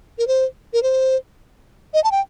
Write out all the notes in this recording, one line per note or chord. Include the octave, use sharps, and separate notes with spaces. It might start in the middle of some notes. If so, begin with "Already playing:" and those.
A#4
C5
A#4
C5
D#5
A5
G5